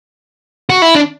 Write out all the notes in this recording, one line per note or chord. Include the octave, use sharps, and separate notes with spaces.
F#4
E4
D4